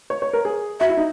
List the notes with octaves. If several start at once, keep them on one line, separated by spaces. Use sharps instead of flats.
C#5
C#5
A#4
G#4
F#4 E5
E4
D#4